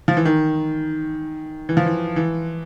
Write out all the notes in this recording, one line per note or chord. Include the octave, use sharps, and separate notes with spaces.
F3
E3
D#3
E3
F3
E3
E3